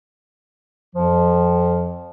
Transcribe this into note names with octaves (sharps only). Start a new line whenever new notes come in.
F2 F3